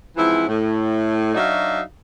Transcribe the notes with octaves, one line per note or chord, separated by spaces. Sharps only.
G#2 E3 F3 C4 E4
A2
F#3 D4 D#4 F#4 E5 F5